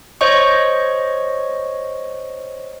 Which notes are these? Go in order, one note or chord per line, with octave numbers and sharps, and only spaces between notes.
C5 C#5 D#5 C#6